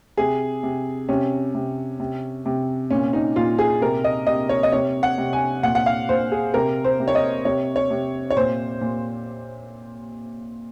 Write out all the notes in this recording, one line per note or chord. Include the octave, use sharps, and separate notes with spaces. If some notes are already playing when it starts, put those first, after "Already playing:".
C3 G#4
C3
C3 C#4
C3
C3
C3
A#2 C#4
D#4
A#2 F4
G#4
C3 A#4
D#5
C3 D#5
C#5
D#5
C3 C#5
F#5
C3
G#5
A#2 F#5
F#5
F5
A#2 C5
G#4
C3 A#4
C5
C3
C#5
D#5
C3 C#5
C#5
C3
C#5
A#2 C5
A#2